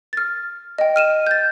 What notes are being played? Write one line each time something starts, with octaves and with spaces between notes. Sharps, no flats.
F6 A6
D#5 G5
F6 D#7 E7
G6 A6